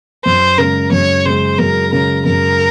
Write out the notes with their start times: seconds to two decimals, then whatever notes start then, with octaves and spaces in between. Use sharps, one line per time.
0.25 F#2 C5
0.58 C#3 A#4
0.63 G#3
0.91 F#2 C#5
1.25 C#3 G#3 C5
1.58 F#2 A#4
1.92 C#3 G#3 A#4
2.25 F#2 A#4